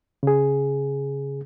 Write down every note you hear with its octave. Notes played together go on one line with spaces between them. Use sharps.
C#3 G#4